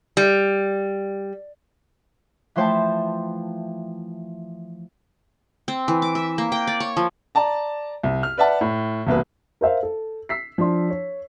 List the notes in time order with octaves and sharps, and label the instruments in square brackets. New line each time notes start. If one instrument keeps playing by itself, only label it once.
[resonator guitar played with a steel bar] G3
[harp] E3 F3 A3 C5 G5 A5
[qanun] C4
E3
D6
E5
A#3
G5
D5
C#5
F3
[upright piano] D5 A5 A#5
C2
F6
B4 D5 E5 F#5 A5
A2
E1 C2 A#3 B4
A#4 C5 E5 F5
A4
E6 B6 C7
F3 D4 C6
C#5